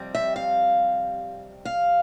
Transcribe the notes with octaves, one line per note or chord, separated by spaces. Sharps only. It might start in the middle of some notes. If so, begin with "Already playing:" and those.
Already playing: F2 C3 G3 C4
E5
F5
F5